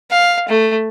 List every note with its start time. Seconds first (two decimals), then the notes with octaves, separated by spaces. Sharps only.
0.11 F5
0.49 A3